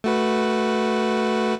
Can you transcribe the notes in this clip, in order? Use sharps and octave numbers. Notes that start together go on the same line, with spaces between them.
A3 F#4 B4